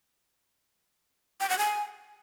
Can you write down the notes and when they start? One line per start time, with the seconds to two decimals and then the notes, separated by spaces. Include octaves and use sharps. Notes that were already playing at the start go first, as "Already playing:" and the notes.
1.41 G5
1.50 F#5
1.59 G#5